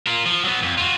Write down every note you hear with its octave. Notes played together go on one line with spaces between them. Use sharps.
F4 A#4
F3
F#3 B3
F2
F4 F#4